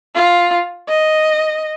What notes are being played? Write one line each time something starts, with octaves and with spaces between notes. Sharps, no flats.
F4
D#5